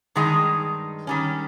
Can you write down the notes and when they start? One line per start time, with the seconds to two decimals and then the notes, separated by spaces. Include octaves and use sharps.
0.15 G2 D#3 G#3 D#4
1.07 D#3 G3 C#4